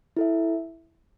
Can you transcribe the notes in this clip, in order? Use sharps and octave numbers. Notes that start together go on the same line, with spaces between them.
E4 A4 E5